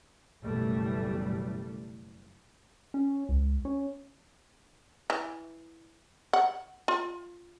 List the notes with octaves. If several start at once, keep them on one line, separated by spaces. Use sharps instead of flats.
F#1 F#2 B2 E3 G3 A3
C#4
C#2
C#4
E3
F#5
F4